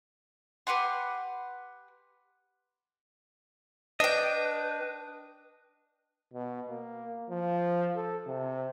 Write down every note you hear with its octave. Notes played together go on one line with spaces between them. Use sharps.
G4 B4 F#5 C6
D4 B4 D#5 G5
B2
A#3
F3
A4
C3